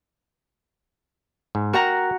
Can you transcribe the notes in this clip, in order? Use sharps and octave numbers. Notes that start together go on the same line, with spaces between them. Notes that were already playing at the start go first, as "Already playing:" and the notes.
G#2
F#4 A#4 F#5 G5 A#5